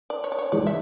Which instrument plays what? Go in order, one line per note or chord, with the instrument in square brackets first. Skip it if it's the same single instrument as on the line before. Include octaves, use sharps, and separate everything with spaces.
[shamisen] D5
C#5
D5
C#5
[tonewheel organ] E3 G#3 [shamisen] D5
[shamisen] E5